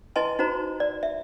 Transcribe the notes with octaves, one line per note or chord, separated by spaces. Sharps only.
E4 B4 D#5 G#5 A5 C6
D#4 F#4 C5 A#5
D5
E5